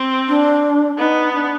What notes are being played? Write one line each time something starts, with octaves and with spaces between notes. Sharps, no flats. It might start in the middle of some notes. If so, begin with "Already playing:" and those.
Already playing: C4
D4
B3 D#4
D4